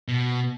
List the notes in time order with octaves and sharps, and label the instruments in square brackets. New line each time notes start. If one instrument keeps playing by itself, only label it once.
[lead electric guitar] B2